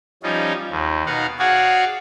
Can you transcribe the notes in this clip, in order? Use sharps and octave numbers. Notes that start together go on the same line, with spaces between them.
F3 G3 C#4 D#4 F4
D#2
B2 D#4 F5 F#5
F#4 G#4 C#5 D5 F5 F#5